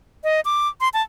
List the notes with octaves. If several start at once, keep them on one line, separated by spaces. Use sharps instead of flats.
D#5
D6
C6
A5